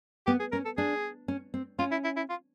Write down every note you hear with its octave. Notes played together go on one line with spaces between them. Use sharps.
B3 G4
G#4
C#4 A#4
A4
D4 G#4
C#4
C4
C#4 F4
E4
E4
E4
F4